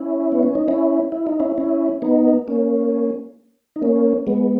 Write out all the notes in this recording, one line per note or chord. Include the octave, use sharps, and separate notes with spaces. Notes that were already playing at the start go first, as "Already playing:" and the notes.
Already playing: C#4 E4
B3
C#4
D#4
C#4 E4
E4
D#4
C#4 E4
C#4 E4
B3 D#4
A#3 C#4
D#4
A#3 C#4
G#3 B3